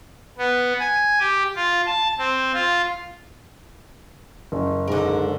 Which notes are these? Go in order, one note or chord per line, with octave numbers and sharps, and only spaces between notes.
B3
G#5
G4
F4
A5
C4
F4
F#1
G#2 D3 A#4